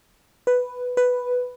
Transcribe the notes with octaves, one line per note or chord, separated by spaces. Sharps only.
B4
B4